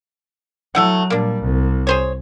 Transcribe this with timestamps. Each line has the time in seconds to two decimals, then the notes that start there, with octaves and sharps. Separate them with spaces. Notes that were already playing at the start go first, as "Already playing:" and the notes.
0.75 F#3 A3 E4 F#5
1.10 A#2 G3 A#3 D4
1.41 C2
1.87 G#4 C5 C#5